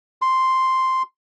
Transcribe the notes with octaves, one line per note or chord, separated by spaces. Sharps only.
C6